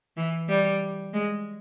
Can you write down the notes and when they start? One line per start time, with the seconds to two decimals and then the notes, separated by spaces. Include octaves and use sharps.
0.17 E3
0.49 G3
1.14 G#3